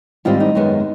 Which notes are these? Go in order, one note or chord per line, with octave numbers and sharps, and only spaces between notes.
G#2 D#3 G3 C4 F4
D#4
F#2 D#3 G#3 B3